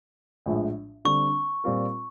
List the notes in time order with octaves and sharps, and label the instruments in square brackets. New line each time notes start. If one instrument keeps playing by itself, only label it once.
[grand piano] A#1 A2 F3 G#3
[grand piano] D3 G3 C4 [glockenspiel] C#6
[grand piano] A#2 G3 C4 F4 A#4